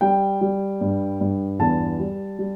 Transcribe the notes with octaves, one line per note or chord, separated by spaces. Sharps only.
G3 G5
G3
G2
G2
E2 A5
G3
G3